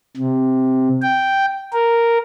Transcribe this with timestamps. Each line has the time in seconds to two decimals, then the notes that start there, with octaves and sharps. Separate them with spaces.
0.17 C3
1.02 G5
1.73 A#4